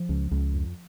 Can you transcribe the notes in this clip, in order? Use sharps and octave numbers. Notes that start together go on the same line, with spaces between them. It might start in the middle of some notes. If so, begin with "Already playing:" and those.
Already playing: F3
C#2
C#2
F2